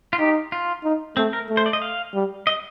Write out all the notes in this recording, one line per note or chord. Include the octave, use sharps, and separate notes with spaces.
F4
D#4 G4
F4
D#4
A3 C4
A#4
A3
C5
D5
D#5
F5
G3
D#5